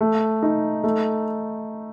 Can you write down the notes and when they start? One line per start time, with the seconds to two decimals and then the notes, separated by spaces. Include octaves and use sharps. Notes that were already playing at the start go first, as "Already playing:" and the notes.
0.01 A3
0.43 D#4
0.84 A3